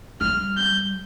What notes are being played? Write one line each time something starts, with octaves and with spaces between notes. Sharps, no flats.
G3 F6
G6